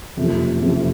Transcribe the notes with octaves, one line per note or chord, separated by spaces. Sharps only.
F#1 F2 C3
F#1 F2 C3